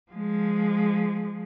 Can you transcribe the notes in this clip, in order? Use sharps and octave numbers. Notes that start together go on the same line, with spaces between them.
F3 G#3